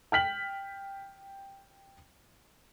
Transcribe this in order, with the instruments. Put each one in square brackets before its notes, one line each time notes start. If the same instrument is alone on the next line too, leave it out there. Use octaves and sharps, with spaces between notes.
[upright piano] G5 F6 B6 F#7